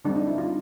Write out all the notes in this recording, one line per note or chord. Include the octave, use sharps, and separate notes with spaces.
D3 G3 C4 D4
D#4
E4
F4